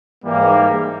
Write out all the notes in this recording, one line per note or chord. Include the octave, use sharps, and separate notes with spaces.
G#2 E3 G3 A#3